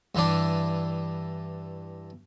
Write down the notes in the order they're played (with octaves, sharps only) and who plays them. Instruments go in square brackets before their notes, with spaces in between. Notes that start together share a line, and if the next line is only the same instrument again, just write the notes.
[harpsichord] G2 E3 D4